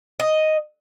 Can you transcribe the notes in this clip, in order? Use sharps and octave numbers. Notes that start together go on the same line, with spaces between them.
D#5